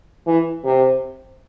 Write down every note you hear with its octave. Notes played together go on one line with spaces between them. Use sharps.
E3
C3